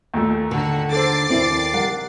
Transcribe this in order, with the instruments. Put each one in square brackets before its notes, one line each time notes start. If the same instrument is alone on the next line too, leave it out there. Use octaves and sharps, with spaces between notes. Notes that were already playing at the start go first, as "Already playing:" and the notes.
[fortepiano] D#2 A#2 A3
[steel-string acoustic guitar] D3 [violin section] F#4
[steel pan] A4 C5 [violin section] D6 A6 C7
[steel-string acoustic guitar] D#2 D5 [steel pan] C4 E4
[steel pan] G3 A#4 [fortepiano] F#5